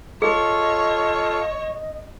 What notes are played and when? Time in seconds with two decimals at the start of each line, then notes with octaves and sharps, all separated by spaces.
0.22 F4 G#4 A4 C#5 D#5